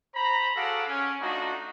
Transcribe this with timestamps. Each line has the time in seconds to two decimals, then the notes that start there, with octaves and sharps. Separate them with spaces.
0.15 C5 A#5 B5
0.55 F#4 G#4 A4 F5 F#5 D6
0.87 C#4
1.21 A3 D4 D#4 F4 F#4